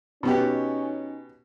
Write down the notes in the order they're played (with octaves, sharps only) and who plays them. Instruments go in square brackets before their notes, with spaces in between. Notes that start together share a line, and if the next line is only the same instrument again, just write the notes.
[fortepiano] B2 B3 G4 [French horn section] C#4 D#4